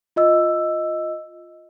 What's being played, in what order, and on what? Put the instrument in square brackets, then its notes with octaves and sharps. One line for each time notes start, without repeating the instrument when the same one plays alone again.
[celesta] F4 D#5 E6